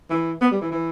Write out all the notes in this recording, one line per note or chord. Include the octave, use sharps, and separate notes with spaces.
E3
B3
G3
E3
E3